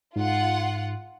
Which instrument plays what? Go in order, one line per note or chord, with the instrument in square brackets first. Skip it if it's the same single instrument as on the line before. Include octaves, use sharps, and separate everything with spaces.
[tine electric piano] G#2 [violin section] F4 F#5